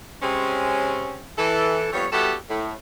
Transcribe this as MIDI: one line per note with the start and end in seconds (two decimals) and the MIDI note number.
0.22 1.21 48
0.22 1.21 56
0.22 1.21 60
0.22 1.21 61
1.37 1.87 52
1.37 1.87 69
1.93 2.06 41
1.93 2.06 55
1.93 2.06 59
1.93 2.06 73
2.12 2.34 55
2.12 2.34 59
2.12 2.34 64
2.12 2.34 66
2.12 2.34 67
2.12 2.34 69
2.49 2.73 45